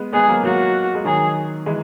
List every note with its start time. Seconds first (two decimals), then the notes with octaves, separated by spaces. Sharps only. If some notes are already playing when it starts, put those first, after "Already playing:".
Already playing: G#3 B3
0.13 G#3 B3 G#4
0.28 F#3 A#3
0.43 F#3 A#3 F#4
0.95 G#3
1.05 D#3 F#3 G#4
1.66 E3 G#3